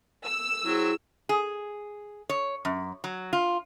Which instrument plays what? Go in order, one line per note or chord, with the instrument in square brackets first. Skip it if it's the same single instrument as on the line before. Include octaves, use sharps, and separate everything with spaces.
[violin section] E6
[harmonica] F#3 C4 [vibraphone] E4 G#4
[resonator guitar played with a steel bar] G#4
C#5
F#2
F#3
F4